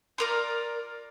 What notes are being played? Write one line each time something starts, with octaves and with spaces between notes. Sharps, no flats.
F4 A#4 D5